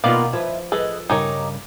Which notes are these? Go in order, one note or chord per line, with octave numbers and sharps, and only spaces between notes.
B2 D#3 A#3 B3 F4 D5 F5
F3 E4 B4
G#4 A4 B4 D#5
G2 C#3 D#4 G4 A#4 C#5